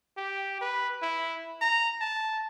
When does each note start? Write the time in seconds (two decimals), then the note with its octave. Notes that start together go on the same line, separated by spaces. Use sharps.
0.17 G4
0.61 B4
1.02 E4
1.61 A#5
2.01 A5